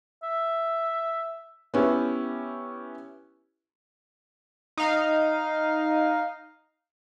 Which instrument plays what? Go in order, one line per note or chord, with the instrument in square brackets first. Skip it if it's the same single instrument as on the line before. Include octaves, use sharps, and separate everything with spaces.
[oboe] E5
[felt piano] B3 C#4 E4 G4
[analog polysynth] D#4 F5